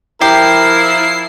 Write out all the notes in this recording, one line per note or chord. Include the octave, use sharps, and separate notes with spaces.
F3 E4 G4 A#4 C7